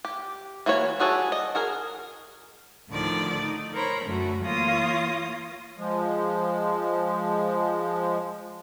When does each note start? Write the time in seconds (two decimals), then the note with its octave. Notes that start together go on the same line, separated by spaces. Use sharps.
0.05 G4
0.66 E3 A#3 F#4 C#5
1.00 G3 F#4 G#4 A4 C#5
1.32 D#5
1.55 F#4 G#4 A#4
2.88 D2 A2 D3 D#3 F3 D5
3.41 D#4
3.73 A#4 C5 C#5 A#5 B5
4.04 F#2 D3 F#3 A3 F#4
4.42 E3 A#3 F4 C#5 D#6 A#6
5.78 F3 G#3